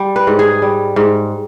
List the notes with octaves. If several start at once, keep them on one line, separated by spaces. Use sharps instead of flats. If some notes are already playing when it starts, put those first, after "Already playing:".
Already playing: G3
B4
G#2
G#4
G3
G#2